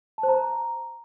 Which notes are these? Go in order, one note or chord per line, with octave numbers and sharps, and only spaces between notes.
A5
C5
A#5